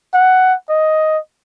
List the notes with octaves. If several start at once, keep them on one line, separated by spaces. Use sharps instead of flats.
F#5
D#5